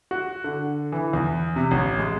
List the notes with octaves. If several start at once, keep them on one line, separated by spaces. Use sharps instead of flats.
F#4
D3
E3
E2
C3
A1
G#3